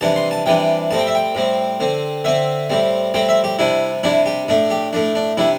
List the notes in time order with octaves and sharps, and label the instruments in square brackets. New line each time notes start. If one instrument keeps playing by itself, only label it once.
[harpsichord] C3 E3 G3 D4 A5
C6
A5
C3 E3 G3 D4 G5
A2 G3 C4 A5
G5
E5
G5
A2 G3 C4
D3 C4
D3 C4 E5
A2 G3 C4
A2 G3 C4 G5
E5
G4
C3 G3 D4 E4
C3 G3 D4 E4
G4
A2 A3 D4
G4
A2 A3 D4
D4
C3 G3 D4 E4